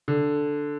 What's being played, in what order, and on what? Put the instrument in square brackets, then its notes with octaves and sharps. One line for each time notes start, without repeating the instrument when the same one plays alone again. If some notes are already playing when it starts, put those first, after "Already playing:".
[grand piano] D3